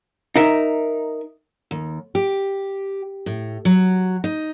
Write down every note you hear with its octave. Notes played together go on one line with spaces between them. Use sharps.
D#4 A#4 E5
D#2
G4
A2
F#3
D#4